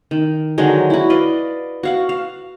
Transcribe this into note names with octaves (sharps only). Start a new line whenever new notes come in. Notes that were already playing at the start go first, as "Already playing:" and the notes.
D#3
D3 D#3 F#3 G#3
E4 F#4
B4 D5 D#5 F5
F#4 F5 F#5
F5